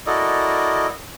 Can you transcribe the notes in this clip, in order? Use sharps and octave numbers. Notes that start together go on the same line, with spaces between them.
E4 F#4 A4 A#4 D5 D#5